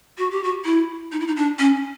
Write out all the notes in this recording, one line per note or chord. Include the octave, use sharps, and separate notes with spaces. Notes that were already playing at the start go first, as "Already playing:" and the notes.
F#4
G4
F#4
E4
D#4
E4
D#4
D4
C#4